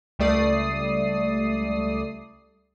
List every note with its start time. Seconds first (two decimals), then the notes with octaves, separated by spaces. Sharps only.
0.19 C#2 G3 A3 D5 D#6 C7